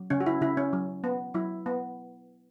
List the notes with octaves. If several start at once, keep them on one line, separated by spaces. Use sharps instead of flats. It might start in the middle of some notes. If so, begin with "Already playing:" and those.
Already playing: F#3
C#3 C#4
F#4
E4
C#3 E4
C#4
F#3
B3
F#3 E4
B3